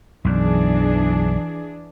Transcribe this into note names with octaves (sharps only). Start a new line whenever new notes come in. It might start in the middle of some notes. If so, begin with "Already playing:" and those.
B1 F#2 E3 D4 G#4